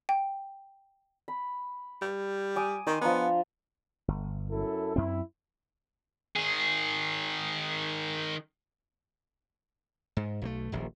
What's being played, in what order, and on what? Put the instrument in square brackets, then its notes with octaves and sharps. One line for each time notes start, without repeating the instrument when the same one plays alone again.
[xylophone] G5
[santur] B5
[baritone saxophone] G3
[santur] G#5 D6 D#6
[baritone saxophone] D#3 [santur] D#5 C6
[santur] F3 D4 A#5 [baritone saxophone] B3
[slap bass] G1
[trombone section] F#2 E4 A4
[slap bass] F#2 C4 [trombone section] E4
[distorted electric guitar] D#3 G#4
[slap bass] G#2
B1 F3 A3
D#1 A#1